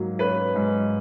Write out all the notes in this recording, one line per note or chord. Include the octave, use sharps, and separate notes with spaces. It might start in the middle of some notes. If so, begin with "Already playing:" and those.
Already playing: G#2 F#3 A#3
C#4 B4
G#2